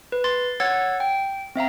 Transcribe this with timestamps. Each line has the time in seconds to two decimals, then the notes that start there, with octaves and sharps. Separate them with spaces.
0.12 B4
0.24 C6 A6
0.60 C#5 F#5 E6 G#6 A6
1.00 G5
1.56 C4 E5 F5 A#5